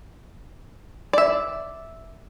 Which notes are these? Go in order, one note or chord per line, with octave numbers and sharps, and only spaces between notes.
D5 E5